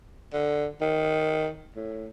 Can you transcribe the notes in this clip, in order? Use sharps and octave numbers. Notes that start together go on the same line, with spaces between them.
D3
D#3
A2